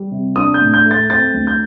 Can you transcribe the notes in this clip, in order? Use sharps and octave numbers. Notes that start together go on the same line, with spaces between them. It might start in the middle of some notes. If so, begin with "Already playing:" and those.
Already playing: G3
C3
D4 D#6
G6
A2
G6
A3
A6
C4 A6
D2
G6